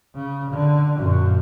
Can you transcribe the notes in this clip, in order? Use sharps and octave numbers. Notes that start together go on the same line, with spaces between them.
C#3
D3
F#2 A#2